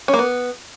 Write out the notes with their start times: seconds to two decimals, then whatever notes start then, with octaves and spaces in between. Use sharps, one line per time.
0.08 C#4
0.14 A#3
0.19 B3